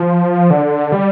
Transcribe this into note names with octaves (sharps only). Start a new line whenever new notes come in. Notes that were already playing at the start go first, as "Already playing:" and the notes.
Already playing: F3
D3
G3